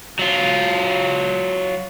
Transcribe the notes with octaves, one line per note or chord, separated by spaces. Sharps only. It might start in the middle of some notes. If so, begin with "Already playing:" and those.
F#3 F4